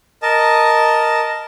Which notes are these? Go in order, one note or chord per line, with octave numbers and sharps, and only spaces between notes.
A#4 D#5 A5